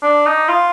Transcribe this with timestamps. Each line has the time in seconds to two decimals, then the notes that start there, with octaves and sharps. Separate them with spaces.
0.02 D4
0.26 D#4
0.49 F4